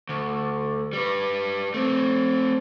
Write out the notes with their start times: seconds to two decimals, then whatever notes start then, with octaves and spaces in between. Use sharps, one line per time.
0.09 D2
0.93 G3 B4
1.74 A3 C4